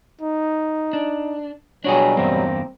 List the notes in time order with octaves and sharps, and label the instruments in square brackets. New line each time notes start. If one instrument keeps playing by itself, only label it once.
[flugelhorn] D#4
[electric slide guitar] D4
[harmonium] B2 F#3 G3 [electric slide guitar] D4 F#4 G#4 [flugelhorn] C#5
[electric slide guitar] E2 G2 A#3 [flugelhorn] C4